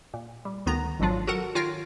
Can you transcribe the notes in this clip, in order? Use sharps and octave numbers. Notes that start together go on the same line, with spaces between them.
A#2
G3
D2 D#3 B3 A#5 A#6
G#1 F2 G#2 F#3 D4 F4
F#4 A4 A#4 F#5
D#3 F4 C#5 G5 F6 A#6